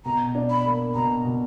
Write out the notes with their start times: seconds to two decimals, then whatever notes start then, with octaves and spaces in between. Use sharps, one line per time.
0.05 B2 A#5
0.35 D4
0.50 B5
0.66 A#3
0.95 B2 A#5
1.25 B2